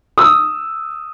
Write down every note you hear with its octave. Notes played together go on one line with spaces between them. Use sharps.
D#6 E6